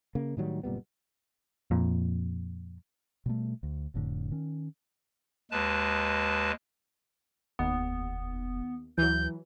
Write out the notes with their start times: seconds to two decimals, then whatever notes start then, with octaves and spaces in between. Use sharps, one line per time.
0.15 C#3 A#3
0.37 A2 D#3 F#3 G3
0.63 F#1 A#2 G3 B3
1.71 F2 A#2
3.26 B2 G3 A3
3.63 D2
3.94 F1 F2 A2 D3
4.31 D#3 C#4
5.51 D#2 G#3 B4 A5
7.59 F1 D#2 B3
8.98 D2 E3 F#3 G6